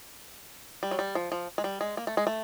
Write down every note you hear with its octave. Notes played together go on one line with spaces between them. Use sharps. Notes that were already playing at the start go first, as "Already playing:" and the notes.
G3
F#3
G3
F3
F3
G#3
G3
G#3
A#3
A3
G#3
A3